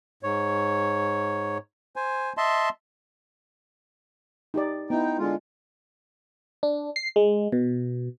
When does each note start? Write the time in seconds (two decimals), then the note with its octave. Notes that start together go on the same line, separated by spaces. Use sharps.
0.23 G#2 C#5
1.96 C5 G#5
2.37 D#5 E5 A5 C6
4.54 D#4 G4 D5
4.90 B3 D#4 E4 G5
5.18 D3 G#3 F4
6.63 D4
6.96 C7
7.16 G#3
7.52 B2